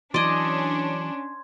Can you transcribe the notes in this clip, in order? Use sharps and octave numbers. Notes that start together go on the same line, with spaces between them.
E3 F#3 C#4 D4 D5 D#5 C6 G#6